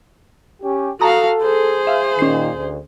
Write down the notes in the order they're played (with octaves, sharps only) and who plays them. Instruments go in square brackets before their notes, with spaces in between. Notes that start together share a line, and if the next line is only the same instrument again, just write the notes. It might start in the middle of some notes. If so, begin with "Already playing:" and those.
[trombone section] C#4 G4
[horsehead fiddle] F#4 F5 [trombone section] A4 [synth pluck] A5 A#5 D#6
[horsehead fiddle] G#4 C5
[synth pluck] E5 F5
[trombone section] A#2 D#3 [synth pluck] C#4 C7
[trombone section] D2